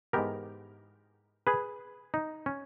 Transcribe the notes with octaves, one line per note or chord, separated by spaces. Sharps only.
G#2 E3 G#3 B3 G4 A#4
G#4 B4
D#4
C#4